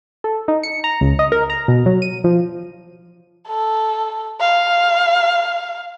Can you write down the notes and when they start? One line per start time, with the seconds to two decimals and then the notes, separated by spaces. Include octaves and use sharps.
0.24 A4
0.48 D#4
0.63 C#7
0.84 A#5
1.01 C#2
1.19 D#5
1.32 A#4
1.50 A#5
1.68 B2
1.86 F#3
2.02 D#7
2.24 F3
3.48 A4
4.40 F5